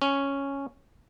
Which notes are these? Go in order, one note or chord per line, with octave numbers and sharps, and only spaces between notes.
C#4